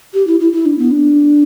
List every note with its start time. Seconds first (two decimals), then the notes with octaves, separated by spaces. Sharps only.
0.14 G4
0.27 E4
0.40 E4
0.53 E4
0.66 D4
0.79 B3
0.91 D4